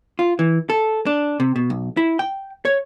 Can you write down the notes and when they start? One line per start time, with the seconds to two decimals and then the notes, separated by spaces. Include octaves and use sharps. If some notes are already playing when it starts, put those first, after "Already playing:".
0.19 F4
0.39 E3
0.70 A4
1.06 D4
1.40 C3
1.56 B2
1.70 B1
1.97 E4
2.19 G5
2.65 C#5